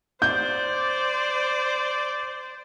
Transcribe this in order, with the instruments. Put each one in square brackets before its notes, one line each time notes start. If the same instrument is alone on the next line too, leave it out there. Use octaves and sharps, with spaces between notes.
[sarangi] C5 [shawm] D5 [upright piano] G6